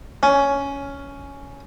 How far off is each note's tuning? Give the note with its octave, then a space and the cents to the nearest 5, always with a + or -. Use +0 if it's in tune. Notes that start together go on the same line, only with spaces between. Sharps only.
C#4 +10